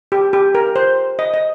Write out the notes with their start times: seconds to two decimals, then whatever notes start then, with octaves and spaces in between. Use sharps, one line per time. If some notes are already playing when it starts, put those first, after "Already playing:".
0.12 G4
0.33 G4
0.55 A#4
0.76 C5
1.19 D#5
1.34 D#5